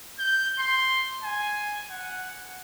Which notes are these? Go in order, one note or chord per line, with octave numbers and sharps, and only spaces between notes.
G6
C6
G#5
F#5